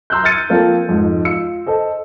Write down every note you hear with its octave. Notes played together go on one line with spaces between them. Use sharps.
A#5 C6 E6 F#6 G6
E6 F6 G#6 A6 C#7 D#7
F3 A#3 C4 F4 A4
F2 G#2
F4 E6 C#7
A4 C5 D#5